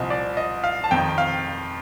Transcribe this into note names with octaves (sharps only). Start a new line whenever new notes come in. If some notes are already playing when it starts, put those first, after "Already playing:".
Already playing: C2 A#2 F3 D#5
D5
D#5
F5
A5
F2 D#3 G5
F5